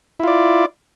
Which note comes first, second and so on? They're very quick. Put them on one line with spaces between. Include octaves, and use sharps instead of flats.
E4 F4 D5